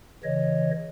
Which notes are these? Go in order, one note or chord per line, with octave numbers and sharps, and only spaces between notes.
C#3 E3 C#5 D#5